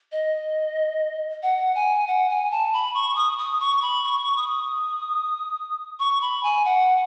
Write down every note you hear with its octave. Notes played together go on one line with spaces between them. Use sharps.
D#5
F#5
G#5
F#5
G#5
A5
B5
C#6
D#6
D#6
C#6
B5
C#6
D#6
C#6
B5
G#5
F#5